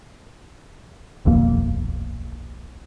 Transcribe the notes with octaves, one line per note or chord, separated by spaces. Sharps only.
D#1 B1 F2 A#3